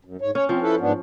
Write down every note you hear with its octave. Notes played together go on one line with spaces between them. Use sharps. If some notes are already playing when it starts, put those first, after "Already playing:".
F#2
G#2 C#5
C#4 C#5
F3 C4
E4 A4 B4
G#2 B3 D4